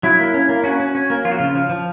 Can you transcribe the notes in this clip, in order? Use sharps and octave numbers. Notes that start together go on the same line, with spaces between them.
F#3 E4
A#3
C#4
A#3
C#4 F#4
C#4
C#4
A#3
F3 F4
F#4
C#3 F4
F3
F3